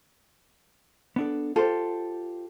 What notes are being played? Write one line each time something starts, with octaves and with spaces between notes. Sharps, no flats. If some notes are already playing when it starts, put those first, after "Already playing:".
B3 D4 A4
F4 G4 A4 C5